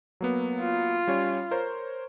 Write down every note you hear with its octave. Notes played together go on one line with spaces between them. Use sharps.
F#3 A#3 B3
F4
G3 C#4 C#5
A#4 C5 C#5